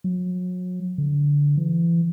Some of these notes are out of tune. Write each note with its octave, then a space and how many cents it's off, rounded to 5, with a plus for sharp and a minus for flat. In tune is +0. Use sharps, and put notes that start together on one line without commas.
F#3 -35
D3 -20
E3 +35